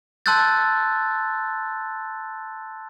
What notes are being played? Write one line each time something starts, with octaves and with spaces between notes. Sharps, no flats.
A5 C6 E6 F#6 G6 A6